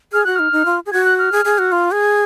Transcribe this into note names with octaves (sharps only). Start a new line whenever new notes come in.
G#4 F6
F#4 F#6
D#4 F6
D#4
F4
G#4
F#4 G#6
F#6
F6
G#4
G#4
F#4
F4
G#4